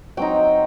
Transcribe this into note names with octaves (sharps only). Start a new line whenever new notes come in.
F#3 C4 D#4 G5